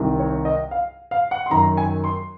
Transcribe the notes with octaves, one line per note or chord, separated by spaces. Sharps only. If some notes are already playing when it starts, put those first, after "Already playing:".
Already playing: C2 C3 D#3
C#5
D#5
F5
F5
F#5
C6
F#2 D#3 A#5
G#5
C6